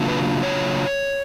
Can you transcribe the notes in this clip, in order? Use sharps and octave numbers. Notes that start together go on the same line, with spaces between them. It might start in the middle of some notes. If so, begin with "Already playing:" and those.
Already playing: C#3 F#3 A#3 D4 F4
B4
C#5